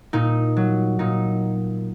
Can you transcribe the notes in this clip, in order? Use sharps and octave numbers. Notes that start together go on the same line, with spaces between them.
A#2 D#4
F#3
A#2 D#4